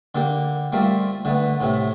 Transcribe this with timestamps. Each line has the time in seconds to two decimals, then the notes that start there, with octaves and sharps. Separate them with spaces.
0.15 D3 A#3 G4
0.72 G3 A3 A#3 C4 F4
1.25 D3 A3 B3
1.61 A2 C3 A3